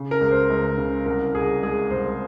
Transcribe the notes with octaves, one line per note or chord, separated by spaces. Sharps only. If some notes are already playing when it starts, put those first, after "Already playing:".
Already playing: C#3
A#4
C#2
C5
C#2
C#3
C2 A#4
C2 G#4
G#3 G#4
C2 C5